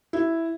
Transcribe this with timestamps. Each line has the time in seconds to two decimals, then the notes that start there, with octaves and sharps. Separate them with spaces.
0.13 E4